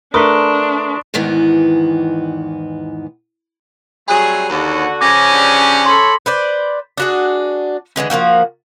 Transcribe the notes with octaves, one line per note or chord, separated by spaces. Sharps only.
A3 D4 A#4 B4 C6 C#6 D#6
E2 G#2 D#3 E3 B3
F#3 G3 A3 C4 G#4 B5 F#6 D#7
D#2 D3 F#4
C#3 F3 C#4 D6 G#6 A#6
D4 G4 F#5
A4 C#5 B5 C6
B4 C5 D5
D4 F#4 G#4
D3 E3 G#3 C#4
F3 G#3 A#3 F#4